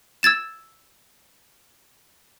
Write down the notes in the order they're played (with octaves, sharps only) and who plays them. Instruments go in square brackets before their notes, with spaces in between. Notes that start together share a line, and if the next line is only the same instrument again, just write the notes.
[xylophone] E6 G#6 A6 E7